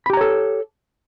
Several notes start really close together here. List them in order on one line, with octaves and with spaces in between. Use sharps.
B5 G4 A#5 C#5 A4